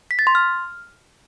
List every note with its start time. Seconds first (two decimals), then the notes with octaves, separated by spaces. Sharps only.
0.11 B6
0.19 A6
0.27 C6
0.35 F6